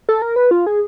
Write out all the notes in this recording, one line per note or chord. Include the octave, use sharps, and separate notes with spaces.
A4
A#4
B4
F4
G#4